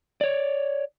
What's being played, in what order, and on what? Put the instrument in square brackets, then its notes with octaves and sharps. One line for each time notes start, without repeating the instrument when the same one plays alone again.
[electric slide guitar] C#5 D5